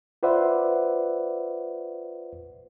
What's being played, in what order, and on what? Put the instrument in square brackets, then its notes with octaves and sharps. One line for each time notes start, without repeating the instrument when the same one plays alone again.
[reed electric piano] F4 B4 C5 D5 E5 F#5